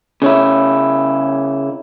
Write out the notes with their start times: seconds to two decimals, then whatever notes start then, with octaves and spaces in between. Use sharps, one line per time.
0.22 C#3 C#4 E4